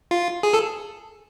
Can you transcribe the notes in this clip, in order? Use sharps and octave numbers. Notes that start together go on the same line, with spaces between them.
F4
G#4
A4